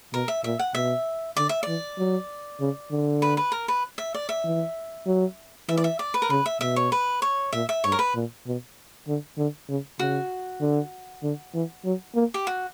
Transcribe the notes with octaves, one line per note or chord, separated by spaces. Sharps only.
B2 A#4
E5
A#2 E5
F#5
B2 E5
D3 D5
E5
E3 D5
F#3
C#3
D3
B4
B4
A#4
B4
E5
D5
E5
E3
F#3
E3 E5
D5
E5
D5
B4
A#4
C#3 B4
E5
B2 E5
C#5
B4
C#5
A#2 E5
E5
G2 C#5
A#4
B4
A#2
B2
D3
D3
C#3
C#3 F#4
D3
D3
E3
F#3
A#3
G4
F#4